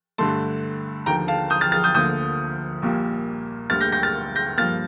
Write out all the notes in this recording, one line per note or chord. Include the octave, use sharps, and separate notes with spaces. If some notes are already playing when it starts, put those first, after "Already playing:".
G2 D3 A3 A5 C6
D#2 D3 F3 G5 A#5
F5 A5
D#6 G6
F6 A6
F6 A6
D#6 G6
D2 D3 F3 A#3 D#6 G6
A#1 A#2 G3 A#3
D2 D3 G3 A#3 F6 A6
G6 A#6
G6 A#6
F6 A6
G6 A#6
G2 F3 A#3 F6 A6